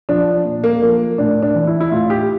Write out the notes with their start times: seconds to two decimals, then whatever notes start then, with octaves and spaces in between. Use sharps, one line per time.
0.09 F3 D4
0.45 A#2
0.64 A#3
0.82 F3 A#3
1.18 A2 D4
1.42 D4
1.55 E3
1.67 E4
1.80 E4
1.91 A2 F4
2.10 G4